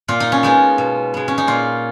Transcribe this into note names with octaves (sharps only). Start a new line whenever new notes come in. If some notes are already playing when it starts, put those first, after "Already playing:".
A#2 F4
D#4
C#4
G#3 B3 D#4
B2
G#3 B3
C#4
D#4
A#2 F4